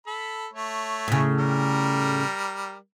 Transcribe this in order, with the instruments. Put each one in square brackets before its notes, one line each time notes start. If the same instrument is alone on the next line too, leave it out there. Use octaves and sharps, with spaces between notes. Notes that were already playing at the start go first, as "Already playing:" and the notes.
[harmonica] A4 B5
A3 C#5
[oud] A2 C#3
[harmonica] G3 A#4